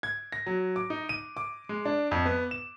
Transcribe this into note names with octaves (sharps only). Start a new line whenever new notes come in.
G#6
A#6
F#3
D6
D#4
D#7
D6
G#3
D4
F2
B3
E7